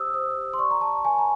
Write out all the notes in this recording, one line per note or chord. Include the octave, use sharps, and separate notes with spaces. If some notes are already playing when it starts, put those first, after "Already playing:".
Already playing: G4 C5 D#6 E6
C5 D#6
G4
C6
D5 C#6
A#5
D5 A5
B4 G#5
A#5